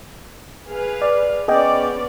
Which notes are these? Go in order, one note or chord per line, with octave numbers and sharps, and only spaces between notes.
G#4 B4 F5
D5
B3 C#4 G#4 D5 D#5 G5